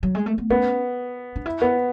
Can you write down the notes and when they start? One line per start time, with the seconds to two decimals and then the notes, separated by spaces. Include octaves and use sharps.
0.03 F#3
0.15 G#3
0.26 A3
0.38 B3
0.50 B3 C#4
1.36 D4
1.46 E4
1.62 B3